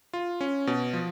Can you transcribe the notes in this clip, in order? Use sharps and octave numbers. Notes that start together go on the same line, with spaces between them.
F4
C#4
B2
F3